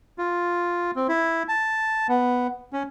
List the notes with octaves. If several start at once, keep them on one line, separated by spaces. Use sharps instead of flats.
F4
C4
E4
A5
B3
C#4